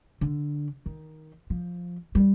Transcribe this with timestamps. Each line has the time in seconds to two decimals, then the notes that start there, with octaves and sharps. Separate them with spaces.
0.21 D3
0.86 D#3
1.50 F3
2.15 G3